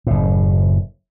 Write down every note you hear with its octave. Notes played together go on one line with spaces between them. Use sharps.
F#1 A2